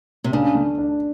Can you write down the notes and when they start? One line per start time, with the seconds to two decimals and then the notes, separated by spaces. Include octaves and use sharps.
0.24 C3
0.32 C#3 D4
0.55 A3
0.78 D4